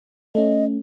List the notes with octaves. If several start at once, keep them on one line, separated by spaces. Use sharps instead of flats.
A3 C#4 D#5